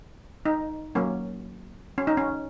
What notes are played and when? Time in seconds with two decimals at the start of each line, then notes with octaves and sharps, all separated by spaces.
0.46 D#4
0.95 F#3 A#3 C#4
1.98 C#4
2.07 D#4
2.17 C#4